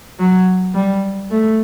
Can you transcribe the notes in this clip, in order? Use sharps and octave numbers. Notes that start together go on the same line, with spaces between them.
F#3
G3
A3